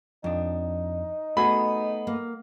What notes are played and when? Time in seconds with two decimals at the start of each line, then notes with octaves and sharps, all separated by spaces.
0.24 F2 D4 D#4
1.37 A3 B3 F#4 G#4 B5
2.07 A#3